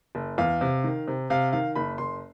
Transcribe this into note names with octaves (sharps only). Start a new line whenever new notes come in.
F#1
E2 F5
C3
D#3
C3
C3 F5
D#3 F5
F#1 B5
F#1 C6